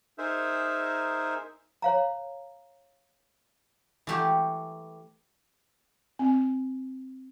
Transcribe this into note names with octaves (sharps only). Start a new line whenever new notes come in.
D#4 G#4 A#4 C5 E5
C#5 F5 A#5
E3 A3 G4
C4